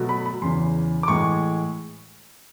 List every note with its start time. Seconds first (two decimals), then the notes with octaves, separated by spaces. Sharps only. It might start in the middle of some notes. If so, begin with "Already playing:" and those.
Already playing: B2 F#3 A3
0.09 B5
0.26 B5
0.42 E2 C#3 E3 C6
1.03 D6
1.08 A2 E3 G#3 C#6